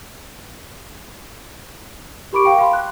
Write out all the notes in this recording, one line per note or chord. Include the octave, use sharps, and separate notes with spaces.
G4 A#4 B5 C#6 D6 D7
F5 G5
F5 B5 C6
F#6